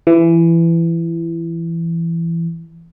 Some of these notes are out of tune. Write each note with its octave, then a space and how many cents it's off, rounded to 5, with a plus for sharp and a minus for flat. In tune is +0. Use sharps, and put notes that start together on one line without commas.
E3 +20